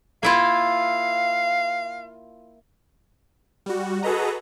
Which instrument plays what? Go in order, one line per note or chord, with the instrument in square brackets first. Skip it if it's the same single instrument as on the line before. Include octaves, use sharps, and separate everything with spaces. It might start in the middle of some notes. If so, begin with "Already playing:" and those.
[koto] A#3 E4 F4 [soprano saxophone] F5
[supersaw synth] G3 F#4
F#4 G#4 A4 B4 D#5 A#5